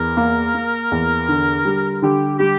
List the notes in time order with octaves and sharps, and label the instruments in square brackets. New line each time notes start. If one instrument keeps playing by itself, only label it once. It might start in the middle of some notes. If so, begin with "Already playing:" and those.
Already playing: [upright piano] E2 [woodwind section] A#4
[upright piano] A#3
A#3
E2
D3
G3
[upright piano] D3 [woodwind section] G4
[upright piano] G3 [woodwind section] G4